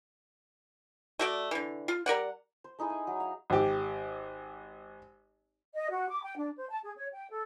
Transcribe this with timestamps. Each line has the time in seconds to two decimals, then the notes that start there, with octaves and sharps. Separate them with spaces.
1.19 A3 F#4 D5
1.51 D3 E3
1.88 F4
2.06 G3 A#4 D5 F#5
2.64 C5
2.79 A3 D#4 E4 G#4
2.90 G#5
3.07 F#3
3.20 F5
3.50 G#1 G4
5.74 D#5
5.90 F#4
6.09 D6
6.23 G5
6.37 D4
6.57 C5
6.70 A5
6.83 G#4
6.96 C#5
7.13 G5
7.30 A4